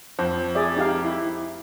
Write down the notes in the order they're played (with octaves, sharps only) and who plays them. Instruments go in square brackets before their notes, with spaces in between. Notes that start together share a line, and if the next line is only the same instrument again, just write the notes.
[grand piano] F2 [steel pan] C5
[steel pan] G#4 D5 E5
D#4 G4 F5
E4